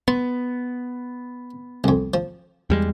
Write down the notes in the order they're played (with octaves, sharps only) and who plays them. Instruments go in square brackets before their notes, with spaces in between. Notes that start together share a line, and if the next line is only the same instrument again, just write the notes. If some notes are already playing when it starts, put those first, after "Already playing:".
[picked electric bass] B3 [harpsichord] C6
[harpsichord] C2 F2
F3
[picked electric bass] E2 G3 G#3